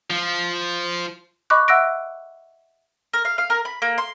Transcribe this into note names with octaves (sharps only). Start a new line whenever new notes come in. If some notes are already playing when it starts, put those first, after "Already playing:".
F3
D#5 B5 C#6 D6 F#6
E5 F#5 E6 F#6 A#6 D7
A#4
F5
F5
A#4
B5
A#3
C6